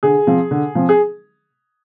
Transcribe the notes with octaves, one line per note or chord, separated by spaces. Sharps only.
D3 G#4
F3 C4
D3
F3 C4
G#4